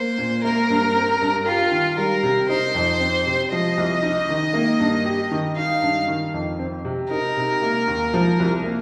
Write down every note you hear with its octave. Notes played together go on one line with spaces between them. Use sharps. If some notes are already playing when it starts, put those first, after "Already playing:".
Already playing: A#3 C5
A#2
A#3 A#4
G2
C4
G2
F4 G4
D#3
G3 A#4
C3
D#4 C5
F2
C4
C3
F3 D#5
C2
D#4
D#3
A#3
G2
G4
D#3
D#4 F5
G2
D#3
F2
C4
C3
D#4 A#4
C3
A#3
D#2
F3
C2
A#3